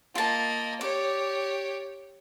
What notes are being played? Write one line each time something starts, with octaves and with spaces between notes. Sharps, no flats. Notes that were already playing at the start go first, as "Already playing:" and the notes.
A#3 F4 D#5 A5
G4 C#5 D5